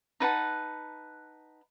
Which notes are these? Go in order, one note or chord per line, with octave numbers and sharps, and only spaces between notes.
D#4 B4 F#5 A5